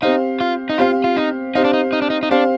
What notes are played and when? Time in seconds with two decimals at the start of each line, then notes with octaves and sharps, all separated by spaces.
0.02 C4 D#4 G4 C5 F5
0.41 F4
0.70 D#4
0.78 C4 F4 G4 C5 F5
1.04 F4
1.17 D#4
1.55 C4 D#4 G4 C5 F5
1.65 D4
1.73 D#4
1.93 D#4
2.02 D4
2.10 D#4
2.23 D#4
2.31 C4 D4 G4 C5 F5